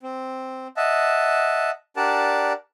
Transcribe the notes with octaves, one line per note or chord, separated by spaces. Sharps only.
C4
D#5 E5 F#5 A5
D4 G4 A#4 D5 F#5 A5